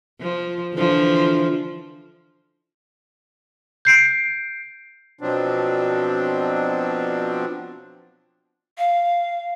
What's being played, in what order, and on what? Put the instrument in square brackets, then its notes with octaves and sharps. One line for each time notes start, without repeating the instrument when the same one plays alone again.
[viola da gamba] F3
D3 E3 F3
[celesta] G6 C7 D7
[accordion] B2 F3 F#3 C4 D4
[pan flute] F5